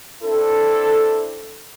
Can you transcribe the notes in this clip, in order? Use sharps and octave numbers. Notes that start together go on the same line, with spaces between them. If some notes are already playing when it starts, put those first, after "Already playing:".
C4 D4 E4 A4